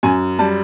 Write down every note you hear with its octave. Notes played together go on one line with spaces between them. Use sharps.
F#2 G#5
G3 A5